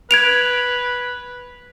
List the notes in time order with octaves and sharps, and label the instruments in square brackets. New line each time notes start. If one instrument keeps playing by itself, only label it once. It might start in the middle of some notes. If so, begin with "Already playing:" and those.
[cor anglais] B4 [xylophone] G#6 D7 F7